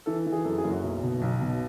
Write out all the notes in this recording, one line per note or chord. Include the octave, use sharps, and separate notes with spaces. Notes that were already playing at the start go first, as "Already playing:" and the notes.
E3 A4
E3
G#4
F#2 A4
G#4
F#1
F#4
B1
B2
B1
B2